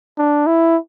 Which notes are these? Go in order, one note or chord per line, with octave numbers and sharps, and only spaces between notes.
D4
E4